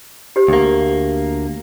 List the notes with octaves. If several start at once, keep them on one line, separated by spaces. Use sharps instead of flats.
G4 C5
D2 A#3